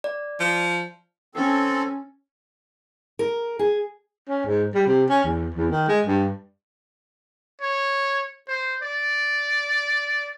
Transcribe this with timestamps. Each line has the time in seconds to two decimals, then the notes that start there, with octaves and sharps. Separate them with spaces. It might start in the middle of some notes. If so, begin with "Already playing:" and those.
0.04 D5
0.40 F3
1.35 C4 C#4 A4
3.19 A#4
3.59 G#4
4.29 C#4
4.46 G#2
4.75 G3
4.86 C3
5.10 C#4
5.24 E2
5.55 E2
5.70 D#3
5.88 G#3
6.07 G2
7.61 C#5
8.48 C5
8.83 D5